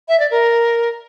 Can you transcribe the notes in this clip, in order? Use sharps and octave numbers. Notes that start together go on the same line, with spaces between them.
E5
D5
A#4